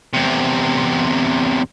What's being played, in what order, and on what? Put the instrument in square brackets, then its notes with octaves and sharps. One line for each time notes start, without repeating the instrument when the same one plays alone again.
[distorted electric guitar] E2 C3